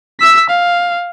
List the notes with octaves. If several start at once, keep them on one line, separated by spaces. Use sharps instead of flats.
E6 B6
F5